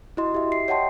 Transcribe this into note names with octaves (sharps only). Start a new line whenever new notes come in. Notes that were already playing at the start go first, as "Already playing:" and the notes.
E4 F#4 D#5 C6
G4 E5
C7
C#5 D#5 F#5 G5 A5 C6